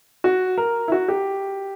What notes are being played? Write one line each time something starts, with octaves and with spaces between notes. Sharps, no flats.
F#4
A#4
E4
F#4
G4